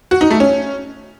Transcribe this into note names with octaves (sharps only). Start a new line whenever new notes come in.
F#4
D#4
A3
C#4